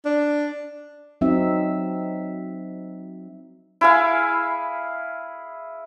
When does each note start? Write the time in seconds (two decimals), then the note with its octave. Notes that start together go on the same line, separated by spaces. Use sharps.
0.05 D4
1.21 F#3 C4 D#4 E5
3.81 E4 G#4 F5